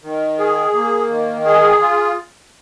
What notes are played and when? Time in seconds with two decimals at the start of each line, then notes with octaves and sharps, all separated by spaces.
0.03 D#3
0.39 G#4
0.74 A#3
1.10 D#3
1.45 G#4
1.80 F4